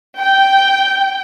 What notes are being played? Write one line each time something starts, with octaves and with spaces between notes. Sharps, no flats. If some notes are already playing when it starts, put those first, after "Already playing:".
G5